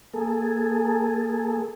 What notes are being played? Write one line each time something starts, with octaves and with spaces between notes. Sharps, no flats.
A#3 G#4 A4